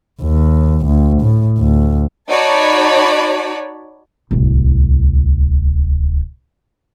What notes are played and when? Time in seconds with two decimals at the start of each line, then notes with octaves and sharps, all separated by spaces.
0.23 D#2
0.86 D2
1.22 A2
1.58 D2
2.29 D#4 F#4 C#5 D5 A5 B5
4.31 D1 C2